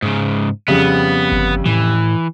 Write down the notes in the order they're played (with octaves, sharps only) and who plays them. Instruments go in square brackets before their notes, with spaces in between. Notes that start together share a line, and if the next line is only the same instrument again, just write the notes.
[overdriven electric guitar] G#2 C#3
[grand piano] F2 C#3 G3 [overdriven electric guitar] B3
[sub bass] G1
[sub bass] A2 [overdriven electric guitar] E3